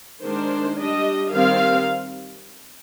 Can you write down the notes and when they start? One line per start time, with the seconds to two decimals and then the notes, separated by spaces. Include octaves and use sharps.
0.22 D#3 G#3 D4 C5
0.77 G3 D4 D#5
1.32 D#3 G3 C4 F5